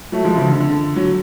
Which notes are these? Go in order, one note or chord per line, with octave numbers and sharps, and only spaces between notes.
F#3 A3
F3 G#3
C#3 F3
D3
D3
F#3